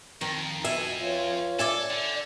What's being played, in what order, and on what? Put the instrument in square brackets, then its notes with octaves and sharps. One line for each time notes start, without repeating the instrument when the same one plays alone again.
[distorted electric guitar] F2 [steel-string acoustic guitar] D#3
[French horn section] B2 [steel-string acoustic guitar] E5 G#5
[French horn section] F4 B4 C#5
[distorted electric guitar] A4 [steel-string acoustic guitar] D5 E5 G#5
[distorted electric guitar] D3